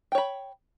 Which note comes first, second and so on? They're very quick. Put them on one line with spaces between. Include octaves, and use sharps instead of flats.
G5 C#5 B5